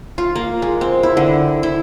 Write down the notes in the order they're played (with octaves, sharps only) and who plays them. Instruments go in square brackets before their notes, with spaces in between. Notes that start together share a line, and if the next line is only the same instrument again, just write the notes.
[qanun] F4
A#3
G#3
C4
E4
D3
E4